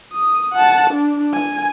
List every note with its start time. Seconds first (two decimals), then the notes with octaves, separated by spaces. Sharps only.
0.13 D#6
0.53 F#5 A5
0.90 D4
1.33 G#5